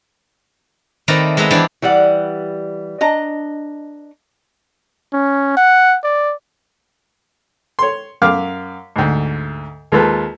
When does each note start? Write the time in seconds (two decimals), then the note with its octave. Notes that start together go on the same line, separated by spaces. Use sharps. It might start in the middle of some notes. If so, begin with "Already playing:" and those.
1.08 D#3 A3 C4 B4 D5 A#5
1.37 G#3 B3 B4 E5 A#5
1.50 E3 B3 D4 G4 C5 D5
1.82 E3 G3 D5 F#5
3.01 D4 D#5 A#5
5.13 C#4
5.57 F#5
6.04 D5
7.79 C#5 C6
8.22 F#2 F5 D6 F6
8.96 D2 G#2
9.92 D#2 G#3 F4 A4 B4 A5